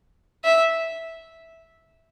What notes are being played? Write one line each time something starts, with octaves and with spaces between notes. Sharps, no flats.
E5